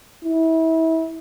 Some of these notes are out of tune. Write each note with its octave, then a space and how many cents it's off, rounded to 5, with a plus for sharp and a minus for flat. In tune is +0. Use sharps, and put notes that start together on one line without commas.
E4 -30